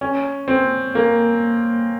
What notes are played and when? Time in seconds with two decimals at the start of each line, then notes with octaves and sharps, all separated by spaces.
0.01 C#4
0.48 C4
0.95 A#3